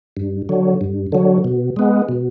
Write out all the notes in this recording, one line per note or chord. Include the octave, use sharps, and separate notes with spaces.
G2
D3 F#3
G2
D3 F#3
B2
G#3 B3
B2